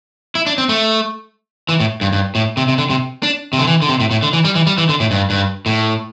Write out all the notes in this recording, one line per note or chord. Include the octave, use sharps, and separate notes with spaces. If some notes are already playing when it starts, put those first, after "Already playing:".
E4
D4
C4
A3
E3
A2
G2
G2
A2
C3
C3
D3
C3
D4
C3
D3
E3
D3
C3
A2
A2
D3
E3
G3
E3
G3
E3
D3
A2
G2
G2
A2